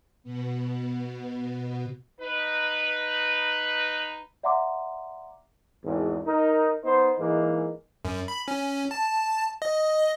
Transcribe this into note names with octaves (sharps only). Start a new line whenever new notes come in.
B2 B3
D#4 B4
D5 E5 F#5 A#5 C6 D6
G#1 E2
D#4 A#4
B3 D#4 C5
G#2 E3 G#3 A#3
F#2
B5
C#4
A5
D#5